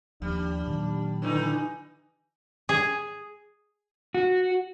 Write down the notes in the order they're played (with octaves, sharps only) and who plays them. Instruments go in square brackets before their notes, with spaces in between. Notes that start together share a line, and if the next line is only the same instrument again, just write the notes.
[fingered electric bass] D#2 F3 [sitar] G3 [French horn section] D4
[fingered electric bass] A#2 D#3 F#3
[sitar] D3 E3 D#4
[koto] G#4
[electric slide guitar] F#4